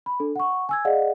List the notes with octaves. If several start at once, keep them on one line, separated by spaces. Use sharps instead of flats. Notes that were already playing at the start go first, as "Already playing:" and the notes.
B5
D4 A4
F#5 C#6
G#5 E6 G#6
G#4 D5 D#5 F5 F#5